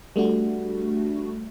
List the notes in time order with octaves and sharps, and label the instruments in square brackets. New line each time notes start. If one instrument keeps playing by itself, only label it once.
[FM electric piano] G3 A3 D4 F#4